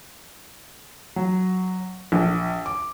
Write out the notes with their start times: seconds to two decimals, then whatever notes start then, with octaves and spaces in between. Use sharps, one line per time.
1.16 F#3
2.12 A#1
2.66 D6